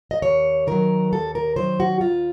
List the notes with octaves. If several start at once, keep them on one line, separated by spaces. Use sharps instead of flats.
D#5
D#2 C#5
D#3 F#3 A#4
D#2 A4
A#4
D#3 F#3 C5
F#4
D#2 F4